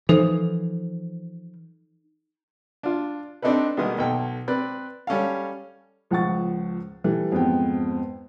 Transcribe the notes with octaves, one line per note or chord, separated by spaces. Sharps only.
E3 F3 D#4 A4 C5
D4 F4
C4 D4 D#4 A4 B4
B2 D#3 G3 G#3 A#3 B3
B1 A4 G5
C4 B4 D5 F#6
G3 C#4 A4 F5
C#2 F3 F#5 C#6 A6
E3 G3 A4
F2 G#2 B3 G5